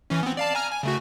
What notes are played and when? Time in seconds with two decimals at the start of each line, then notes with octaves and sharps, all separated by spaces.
0.10 E3 C#4
0.23 B3 C4
0.37 D5 F5 A5
0.55 G#5 A#5 F6
0.71 G#5
0.83 C#3 A3 F#4